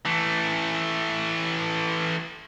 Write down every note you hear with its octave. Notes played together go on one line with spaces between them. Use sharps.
E3 A3